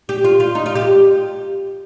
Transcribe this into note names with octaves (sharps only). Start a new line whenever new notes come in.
G4
F4
F4
D#4
F4
G4